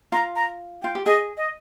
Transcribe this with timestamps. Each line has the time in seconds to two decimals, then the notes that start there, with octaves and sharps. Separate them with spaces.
0.12 F4 A#5
0.36 A#5
0.82 F4 G5
0.95 G4
1.06 G#4 D#5
1.37 D#5